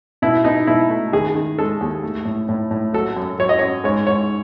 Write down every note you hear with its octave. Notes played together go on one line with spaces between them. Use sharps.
B2 E4
B2 D#4
B2 E4
A3
D#3 G#4
D#3
G#3 A4
D#2
A3
A2
A2
A2
F#3 A4
F#2
F#3 C#5
D#5
F#2 C#5
G#2 C#5
G#2 C#5